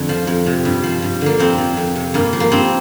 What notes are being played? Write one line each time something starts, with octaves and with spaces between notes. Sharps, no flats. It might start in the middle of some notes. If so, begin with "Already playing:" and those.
Already playing: F2 D3
F3
F2
C3
G2
F3
G2
D3 A#3
F2 C4
F3
F2
C3
G2 A#3
F3
A#3
G2 C4